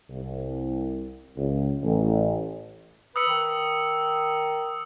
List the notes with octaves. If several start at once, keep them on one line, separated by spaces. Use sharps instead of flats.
C2
C#2
A1
B4 D#6 E6 C#7
D#3